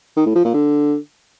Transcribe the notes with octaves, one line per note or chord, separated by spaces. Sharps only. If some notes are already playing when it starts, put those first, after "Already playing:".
D#3
A2
F3
A#2
D3